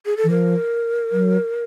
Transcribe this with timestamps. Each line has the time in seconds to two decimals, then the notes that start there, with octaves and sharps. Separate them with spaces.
0.06 G#4
0.17 A4
0.24 E3
0.30 F3 A#4
1.12 F#3